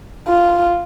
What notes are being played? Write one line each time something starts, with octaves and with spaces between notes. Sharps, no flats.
F4